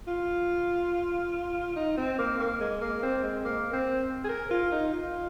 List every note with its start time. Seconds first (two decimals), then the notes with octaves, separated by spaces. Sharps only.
0.07 F4
1.76 D#4
1.98 C4
2.18 A#3
2.40 A#3
2.60 G#3
2.81 A#3
3.03 C4
3.23 G#3
3.45 A#3
3.73 C4
4.25 G#4
4.29 A#4
4.51 F4
4.72 D#4
4.93 F4